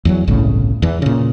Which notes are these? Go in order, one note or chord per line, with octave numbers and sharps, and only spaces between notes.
E2 F3 F#3
G1 C2 A2 C#3
E2 E3
A#2 C#3